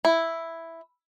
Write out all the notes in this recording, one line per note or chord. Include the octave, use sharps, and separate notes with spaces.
E4